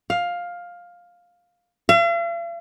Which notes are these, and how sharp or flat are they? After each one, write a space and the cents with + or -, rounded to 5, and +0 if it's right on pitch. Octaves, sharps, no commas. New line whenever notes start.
F5 +10
F5 -45